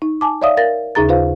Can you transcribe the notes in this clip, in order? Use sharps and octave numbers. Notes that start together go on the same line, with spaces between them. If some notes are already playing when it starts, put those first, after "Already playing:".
D#4
G#5 A5 D6
C#5 D5 E5 F5 D#6
A#4 F5 A6 A#6
D#2 C#3 D#4 G#4 A#5 A6
F4 B4 C5 F5